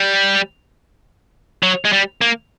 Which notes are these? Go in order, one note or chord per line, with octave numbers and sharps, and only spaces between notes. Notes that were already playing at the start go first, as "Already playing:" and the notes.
Already playing: G3
F#3
G#3
G3
A#3